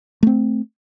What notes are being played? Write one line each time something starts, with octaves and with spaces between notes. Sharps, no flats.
A3 C4